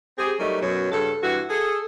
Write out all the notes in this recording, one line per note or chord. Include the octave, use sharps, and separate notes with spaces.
C4 G4 G#4
F#3 G3 A3 D#4 A#4
F#2 B2 F#3
G2 C#3 A4
G2 E3 F#4
G#4 A4